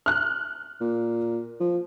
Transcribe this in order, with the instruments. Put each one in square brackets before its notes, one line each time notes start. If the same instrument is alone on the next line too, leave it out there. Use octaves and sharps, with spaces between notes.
[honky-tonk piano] F6 F#6
[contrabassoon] A#2
F3